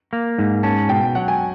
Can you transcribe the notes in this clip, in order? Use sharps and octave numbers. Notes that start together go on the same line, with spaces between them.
A#3
G#2
C#4 A5
B2 G5
F#3 F#5
G#5